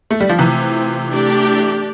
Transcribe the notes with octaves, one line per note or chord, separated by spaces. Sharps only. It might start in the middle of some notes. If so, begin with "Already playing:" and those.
A3
G3
F3
C3 E3 A3 C4 F4
A3 D4 G4 D5